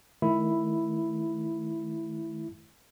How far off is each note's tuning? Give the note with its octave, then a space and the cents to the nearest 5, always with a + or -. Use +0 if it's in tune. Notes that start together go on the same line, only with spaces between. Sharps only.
D#3 +0 A3 -35 E4 +0